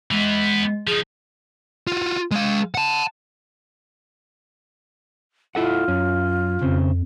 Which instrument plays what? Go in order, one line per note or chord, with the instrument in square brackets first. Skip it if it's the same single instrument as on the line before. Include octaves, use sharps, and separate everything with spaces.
[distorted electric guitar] E3 B3 [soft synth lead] G#3
[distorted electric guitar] F3 D#4 [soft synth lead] G#4
[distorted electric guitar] F4 F#4
G#3 F5
F#5 A5
[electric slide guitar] E4 A4 F#5 [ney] F4
[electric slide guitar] F#2 C#4
[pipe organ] F2 [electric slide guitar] C#3 C4